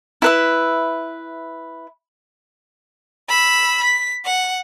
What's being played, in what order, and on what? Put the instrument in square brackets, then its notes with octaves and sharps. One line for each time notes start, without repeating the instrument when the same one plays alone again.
[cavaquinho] E4 B4 E5
[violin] B5 E6
B6
F#5